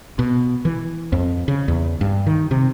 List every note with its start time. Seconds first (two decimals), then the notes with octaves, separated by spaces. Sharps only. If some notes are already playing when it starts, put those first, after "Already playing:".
0.19 B2
0.65 E3
1.12 F2
1.48 C#3
1.68 E2
2.01 G2
2.27 D#3
2.51 C3